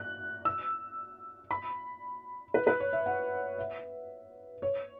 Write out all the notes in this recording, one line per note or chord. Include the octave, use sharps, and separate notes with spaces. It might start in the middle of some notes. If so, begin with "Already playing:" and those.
Already playing: F#6
E6
B5
B4
B4
C#5
E5
F#5
E5
C#5